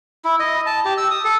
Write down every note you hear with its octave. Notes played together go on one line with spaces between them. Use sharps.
E4
D#5
A5
G4
E6
D#6
A4